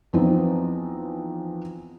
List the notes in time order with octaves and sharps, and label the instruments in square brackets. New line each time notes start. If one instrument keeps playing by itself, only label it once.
[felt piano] E2 F3 B3 C4 D#4